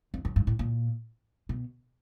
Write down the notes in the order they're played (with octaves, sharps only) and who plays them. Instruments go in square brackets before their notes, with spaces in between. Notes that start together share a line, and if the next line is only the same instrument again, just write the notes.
[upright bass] F2
F#2
G2
A2
A#2
B2